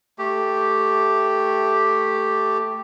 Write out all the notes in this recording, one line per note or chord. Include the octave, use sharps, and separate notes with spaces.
A3 G4